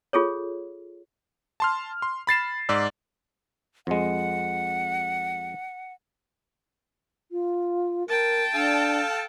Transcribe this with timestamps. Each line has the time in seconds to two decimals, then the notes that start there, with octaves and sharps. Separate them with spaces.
0.13 F4 G#4 A4 C#5
1.60 A5 C6 F6
2.02 C6
2.27 B5 A6 C7 E7
2.69 G#2 D5 E6
3.87 F2 G#3 F#5
7.32 F4
8.08 A#4 G5 A5
8.54 D4 A4 F5